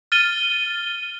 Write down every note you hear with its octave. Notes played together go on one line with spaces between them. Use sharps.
F6 A6 D#7 G7